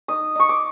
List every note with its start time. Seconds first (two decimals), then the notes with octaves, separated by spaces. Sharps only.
0.08 D#4 D#6
0.35 D#4 C#6
0.49 D6